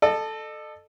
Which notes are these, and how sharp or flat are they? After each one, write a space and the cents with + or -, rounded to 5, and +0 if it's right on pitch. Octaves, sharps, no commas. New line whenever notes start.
A4 +0 D#5 -40